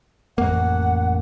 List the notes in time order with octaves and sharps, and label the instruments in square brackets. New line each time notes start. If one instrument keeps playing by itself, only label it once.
[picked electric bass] A1 F2 A#3 [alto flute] F#5